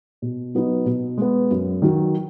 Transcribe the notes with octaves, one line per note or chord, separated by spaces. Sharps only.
B2
F#3 B3 D#4
B2
G#3 B3
F#2
D#3 F#3